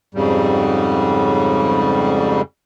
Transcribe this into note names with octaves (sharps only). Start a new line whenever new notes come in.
F2 G#2 C#3 G3